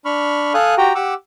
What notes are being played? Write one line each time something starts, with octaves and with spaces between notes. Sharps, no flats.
D4 B5 C#6 F6
A4 F5 G#5 D#6 F#6
F#4 G4 G5 A#5
G4 F#5 D6 E6